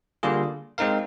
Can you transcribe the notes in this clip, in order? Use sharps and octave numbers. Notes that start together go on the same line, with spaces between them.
D3 G3 A#3 F4 G#4
G#3 C4 D#4 A#4 F5